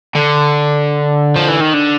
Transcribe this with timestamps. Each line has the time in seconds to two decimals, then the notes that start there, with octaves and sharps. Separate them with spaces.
0.15 D3
1.36 F3
1.48 E3
1.61 D#3
1.74 D3